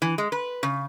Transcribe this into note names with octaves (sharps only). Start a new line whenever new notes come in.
E3
G#3
B4
C#3